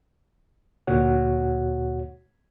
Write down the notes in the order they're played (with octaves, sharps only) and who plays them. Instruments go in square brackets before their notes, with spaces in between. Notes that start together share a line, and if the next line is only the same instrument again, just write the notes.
[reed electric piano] D2 A#2 F#4 C#5 F#5